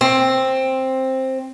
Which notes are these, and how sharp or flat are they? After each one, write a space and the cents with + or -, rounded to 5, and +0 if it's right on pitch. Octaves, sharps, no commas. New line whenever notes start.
C4 +10